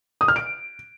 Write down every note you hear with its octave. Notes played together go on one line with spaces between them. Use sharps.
D#6
F6
D7